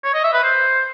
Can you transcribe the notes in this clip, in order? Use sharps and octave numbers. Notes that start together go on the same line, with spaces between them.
C#5
D#5
E5
B4
C5